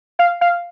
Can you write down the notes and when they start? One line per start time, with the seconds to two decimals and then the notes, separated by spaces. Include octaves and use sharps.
0.19 F5
0.41 F5